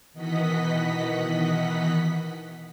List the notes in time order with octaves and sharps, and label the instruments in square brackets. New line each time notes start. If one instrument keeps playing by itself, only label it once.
[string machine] B2 D#3 E3 D#5 F#5 B6